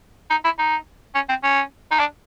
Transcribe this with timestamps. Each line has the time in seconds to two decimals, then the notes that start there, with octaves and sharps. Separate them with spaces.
0.30 D#4
0.44 E4
0.59 D#4
1.15 C#4
1.29 C4
1.43 C#4
1.91 D#4
1.99 D4